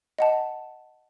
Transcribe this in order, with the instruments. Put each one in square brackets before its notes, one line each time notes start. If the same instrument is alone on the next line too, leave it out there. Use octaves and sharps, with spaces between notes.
[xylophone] D#5 F#5 A5